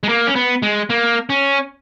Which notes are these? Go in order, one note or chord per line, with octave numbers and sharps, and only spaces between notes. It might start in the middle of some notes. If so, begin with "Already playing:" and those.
G#3
A#3
C#4
B3
G#3
A#3
C#4